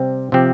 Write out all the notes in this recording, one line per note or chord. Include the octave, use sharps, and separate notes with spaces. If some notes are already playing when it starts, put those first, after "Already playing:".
Already playing: C3 G3 C4
C3 F3 C4 G4